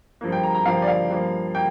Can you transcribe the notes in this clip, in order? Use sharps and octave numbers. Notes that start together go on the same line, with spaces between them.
G2 F3 A#3
G5
A#5
A#5
G2 F3 A#3 F5
D5
F5
G2 F3 A#3
A#3 G5